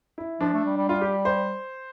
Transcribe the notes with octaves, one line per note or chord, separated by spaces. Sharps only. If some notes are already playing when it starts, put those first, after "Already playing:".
E4
F3 D4
A3
G3
G3
G3 F4
G4
C5